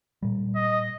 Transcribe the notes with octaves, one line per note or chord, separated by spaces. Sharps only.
A#2 G3
D#5